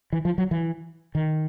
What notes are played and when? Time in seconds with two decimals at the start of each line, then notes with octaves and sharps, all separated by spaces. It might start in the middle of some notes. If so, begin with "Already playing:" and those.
0.13 E3
0.25 F3
0.38 F#3
0.51 E3
1.15 D#3